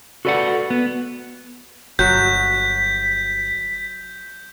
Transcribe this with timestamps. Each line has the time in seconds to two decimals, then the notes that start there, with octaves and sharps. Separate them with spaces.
0.25 F#4 A4 B4 D5 D#5 F#5
0.70 B3
1.99 G1 F#3 F#4 G6 B6